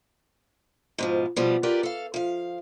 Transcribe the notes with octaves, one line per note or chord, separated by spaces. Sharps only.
G#2 B2 F3
B2 F3 G3
F4 G4 A#4 B4 D5
A4 F5
F3 F5